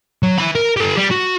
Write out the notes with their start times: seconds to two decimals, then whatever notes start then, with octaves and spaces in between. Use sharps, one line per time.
0.23 F#3
0.38 E3 B5
0.55 A#4
0.77 G4 A4
0.98 G3
1.11 F#4